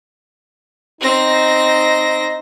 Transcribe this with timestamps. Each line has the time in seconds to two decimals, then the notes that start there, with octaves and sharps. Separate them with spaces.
1.01 C4 D#4 A#6